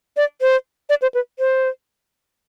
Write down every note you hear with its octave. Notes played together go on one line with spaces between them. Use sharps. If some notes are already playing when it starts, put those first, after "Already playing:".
D5
C5
D5
C5
B4
C5